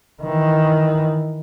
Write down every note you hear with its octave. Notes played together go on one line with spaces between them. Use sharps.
D#3 E3